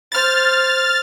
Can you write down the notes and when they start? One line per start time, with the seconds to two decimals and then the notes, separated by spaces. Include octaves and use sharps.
0.12 C5 F6 A6